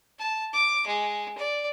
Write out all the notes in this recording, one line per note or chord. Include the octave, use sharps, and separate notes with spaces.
A5
D6
G#3
D5